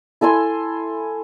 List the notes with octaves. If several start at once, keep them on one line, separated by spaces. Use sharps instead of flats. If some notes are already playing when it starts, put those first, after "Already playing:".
E4 A4 G#5 C6